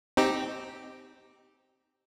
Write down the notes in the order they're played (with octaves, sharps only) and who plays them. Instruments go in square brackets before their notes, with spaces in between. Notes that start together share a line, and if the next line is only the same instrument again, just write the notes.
[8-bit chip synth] C4 D#4 G4